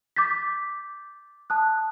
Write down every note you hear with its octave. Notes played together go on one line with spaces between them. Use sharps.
D6 G6 A6 B6
A5 D#6 F#6